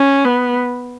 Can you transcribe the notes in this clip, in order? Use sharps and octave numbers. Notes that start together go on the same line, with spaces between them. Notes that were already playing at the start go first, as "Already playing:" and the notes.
Already playing: C#4
B3